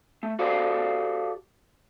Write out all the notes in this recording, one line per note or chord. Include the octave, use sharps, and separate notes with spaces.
A3
F#4 G4 A4 C5 D5 F5